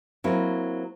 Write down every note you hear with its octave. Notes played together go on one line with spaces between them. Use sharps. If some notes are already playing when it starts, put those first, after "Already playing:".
F#3 A#3 C4 E4